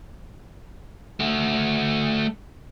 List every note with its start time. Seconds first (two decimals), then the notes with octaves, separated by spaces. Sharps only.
1.20 A3 F#4